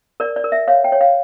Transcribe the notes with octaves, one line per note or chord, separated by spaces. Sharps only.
A#4 D5
D5
A#4
E5
C#5 F5
G5
C#5
F5